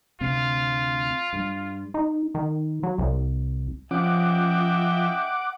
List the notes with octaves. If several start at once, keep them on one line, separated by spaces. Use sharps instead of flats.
D2 C3 C4 F4
G2 G3
D#4
D#3
F#3
C2
F3 C#4 D#5 E5 F#5 G5 D6